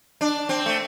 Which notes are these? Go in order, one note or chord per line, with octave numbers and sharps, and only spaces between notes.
D4
C4
A3